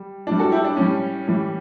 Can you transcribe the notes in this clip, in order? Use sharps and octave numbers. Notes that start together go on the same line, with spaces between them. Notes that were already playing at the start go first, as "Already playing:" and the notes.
Already playing: G3
A2 G3 D4
F#4 A4
E4 G4
D4
A2 G3 C#4
A2 E3 G3